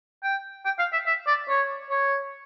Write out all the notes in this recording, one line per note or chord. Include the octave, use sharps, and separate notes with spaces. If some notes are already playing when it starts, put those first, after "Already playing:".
G5
G5
F5
E5
E5
D5
C#5
C#5